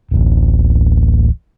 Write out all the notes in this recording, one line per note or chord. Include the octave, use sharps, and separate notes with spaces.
D1 A1